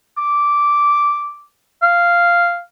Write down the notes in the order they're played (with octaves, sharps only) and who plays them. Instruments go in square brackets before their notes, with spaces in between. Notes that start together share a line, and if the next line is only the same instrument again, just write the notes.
[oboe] D6
F5